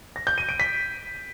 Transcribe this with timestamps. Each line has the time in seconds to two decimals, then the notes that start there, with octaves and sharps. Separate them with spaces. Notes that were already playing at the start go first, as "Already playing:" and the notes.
0.16 A#6
0.27 G6
0.38 D#7
0.49 D7
0.60 B6